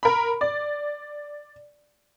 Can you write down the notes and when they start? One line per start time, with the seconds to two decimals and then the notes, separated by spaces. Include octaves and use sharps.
0.03 A#4 B5
0.41 D5